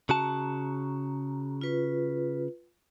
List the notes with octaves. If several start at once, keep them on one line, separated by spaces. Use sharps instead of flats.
C#3 F#4 A5 A#5
F4 B4